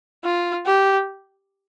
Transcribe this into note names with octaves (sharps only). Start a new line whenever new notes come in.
F4
G4